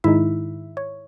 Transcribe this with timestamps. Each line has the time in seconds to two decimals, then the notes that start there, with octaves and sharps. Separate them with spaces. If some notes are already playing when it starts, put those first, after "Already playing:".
0.04 G#2 D#3 G#3 D#4 E4 E5
0.77 C#5